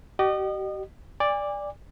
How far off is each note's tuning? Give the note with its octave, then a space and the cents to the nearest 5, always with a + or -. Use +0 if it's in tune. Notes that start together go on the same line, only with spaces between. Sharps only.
G4 -40 D#5 -35
D5 +0 G#5 -35